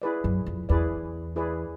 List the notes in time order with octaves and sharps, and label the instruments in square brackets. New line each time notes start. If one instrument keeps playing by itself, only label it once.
[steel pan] E4 G#4 B4 D5
[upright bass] F#2
F2
[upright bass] E2 [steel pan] E4 G#4 B4 D5
[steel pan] E4 G#4 B4 D5